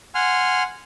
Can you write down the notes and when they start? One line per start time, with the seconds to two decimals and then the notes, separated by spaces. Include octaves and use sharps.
0.15 F#5 G#5 C6 F6